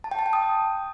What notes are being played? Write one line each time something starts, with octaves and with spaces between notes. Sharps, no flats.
A5
G5
A5
G5
D#6